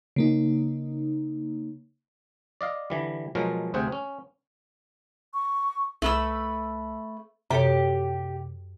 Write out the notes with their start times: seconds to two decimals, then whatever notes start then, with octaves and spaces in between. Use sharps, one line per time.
0.16 C#3 A#3 D#4
2.61 D5 D#5 F5
2.90 D3 E3 G3
3.35 B2 F3 F#3 G#3 F#4 A#4
3.74 D2 C3 C4 G#4 F#5 G5
3.92 C#4
5.34 C#6
6.02 C2 A3 B4 E6
7.51 F#2 C3 G4 A4 C#5